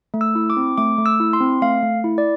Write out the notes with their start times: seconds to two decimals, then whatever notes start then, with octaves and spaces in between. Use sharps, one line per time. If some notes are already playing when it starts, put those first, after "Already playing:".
0.14 A3
0.21 E6
0.35 E4
0.50 D6
0.57 C4
0.78 A3 D6
0.98 A3
1.06 E6
1.20 E4
1.33 C6
1.41 C4
1.62 A3 F5
1.83 A3
2.04 E4
2.18 D5